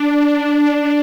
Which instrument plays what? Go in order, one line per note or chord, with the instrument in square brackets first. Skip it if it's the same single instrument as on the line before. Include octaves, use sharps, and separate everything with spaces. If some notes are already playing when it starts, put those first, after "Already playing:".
Already playing: [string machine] D4
D4